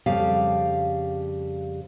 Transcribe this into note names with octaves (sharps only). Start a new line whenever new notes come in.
F2 C#3 G3 G4 F5